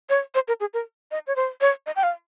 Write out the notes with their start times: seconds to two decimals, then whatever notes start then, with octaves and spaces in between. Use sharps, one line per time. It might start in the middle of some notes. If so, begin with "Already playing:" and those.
0.09 C#5
0.35 C5
0.48 A#4
0.60 G#4
0.74 A#4
1.11 D#5
1.27 C#5
1.36 C5
1.61 C#5
1.86 D#5
1.96 G5
2.03 F5